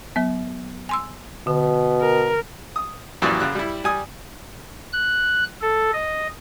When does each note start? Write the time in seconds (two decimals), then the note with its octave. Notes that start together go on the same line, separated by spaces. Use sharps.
0.16 F#3 B3
0.89 G#5 C6 E6
1.47 B2 D3
2.02 A#4
2.76 D#6
3.22 F#2 A#2 E3 F3 G3 F#4
3.40 F#2 C#3 F#6
3.55 G3 E4
3.84 G3 G#5 D#6
4.93 F#6
5.61 A4
5.93 D#5